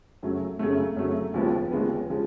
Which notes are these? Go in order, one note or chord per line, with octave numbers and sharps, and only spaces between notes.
F#2 C#3 F#3 A3
F#2 C#3 F#3 A3
F#2 C#3 F#3 A3
D#2 C#3 F3 G#3 B3
D#2 C#3 F3 G#3 B3
C#3 F3 G#3